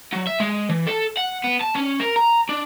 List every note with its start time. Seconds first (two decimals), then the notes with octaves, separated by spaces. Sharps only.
0.13 F#3
0.27 E5
0.40 G#3
0.70 E3
0.87 A4
1.17 F#5
1.44 B3
1.61 A5
1.75 C#4
2.00 A#4
2.16 A#5
2.49 D4